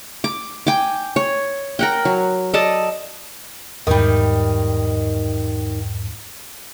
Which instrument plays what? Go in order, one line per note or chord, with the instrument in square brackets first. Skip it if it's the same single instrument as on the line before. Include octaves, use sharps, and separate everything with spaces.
[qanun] D6
G5 G#5 D6
C#5
A#4 F#5 G5
F#3
A4 D5 D#5 A5
[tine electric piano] E2 G#2 [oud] D#3 G3